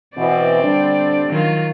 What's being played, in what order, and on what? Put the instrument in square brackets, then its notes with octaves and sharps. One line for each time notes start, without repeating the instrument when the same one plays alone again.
[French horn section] B2 E3 [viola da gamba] C4 D5
[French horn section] D3 G3 D4
[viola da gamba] D#3 F#3 F4